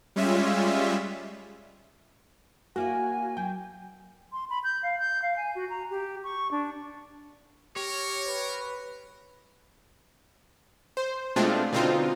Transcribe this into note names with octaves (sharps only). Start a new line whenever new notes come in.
G3 G#3 C#4 F4 E5
A#3 E4 F#4 D5 F5 G#5
F#3 G5
C6
B5
G6
F5
G6
F5
G#5
F#4
A#5
G4
C#6
D4
G4 A#4 C#5
B4
C5
B2 G#3 A3 C4 D4 F4
B2 D3 C4 D#4 F4